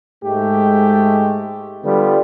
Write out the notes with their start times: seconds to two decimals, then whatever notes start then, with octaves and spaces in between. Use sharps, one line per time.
0.25 G#2 G#3 A3 G4
1.85 D3 G3 B3 F4